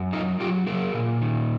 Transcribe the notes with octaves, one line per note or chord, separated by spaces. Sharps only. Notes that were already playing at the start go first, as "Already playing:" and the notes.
Already playing: F#2
F#3 D#4 F4
F#3 F4 G4
F#3 G#4 A#4
A#2
D#3